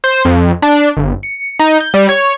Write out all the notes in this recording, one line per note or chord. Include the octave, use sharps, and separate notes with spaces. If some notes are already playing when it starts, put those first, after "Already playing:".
C5
F2
D4
G1
C#7
D#4
G6
G3
C#5